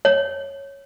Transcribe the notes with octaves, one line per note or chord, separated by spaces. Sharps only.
C#5